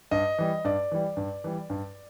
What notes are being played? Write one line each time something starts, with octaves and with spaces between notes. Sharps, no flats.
G2 D#5
E3 G3
G2 D5
E3 G3
G2
E3 G3
G2